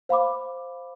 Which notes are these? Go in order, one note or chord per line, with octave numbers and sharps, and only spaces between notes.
C5 F5 B5 D6